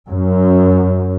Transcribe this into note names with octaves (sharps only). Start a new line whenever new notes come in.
F#2